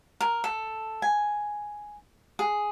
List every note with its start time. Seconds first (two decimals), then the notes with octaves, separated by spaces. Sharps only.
0.21 A#4
0.44 A4
1.02 G#5
2.39 G#4